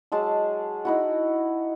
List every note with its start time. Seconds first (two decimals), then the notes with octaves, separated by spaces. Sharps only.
0.12 F#3 G#3 A5 E6
0.85 D#4 E4 F#4